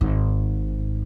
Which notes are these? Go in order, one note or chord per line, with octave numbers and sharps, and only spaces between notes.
G#1 G#2